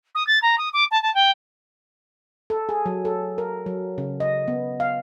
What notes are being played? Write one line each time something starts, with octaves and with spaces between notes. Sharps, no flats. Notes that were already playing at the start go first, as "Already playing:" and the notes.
D#6
A6
A#5
D#6
D6
A5
A5
G5
A4
G#4
F#3
A4
A#4
F#3
C#3
D#5
B3
F5